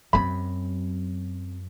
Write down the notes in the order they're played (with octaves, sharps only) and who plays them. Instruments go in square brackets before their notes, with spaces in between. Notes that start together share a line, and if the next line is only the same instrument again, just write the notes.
[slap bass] F#2 [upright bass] F#3 C4 [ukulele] B5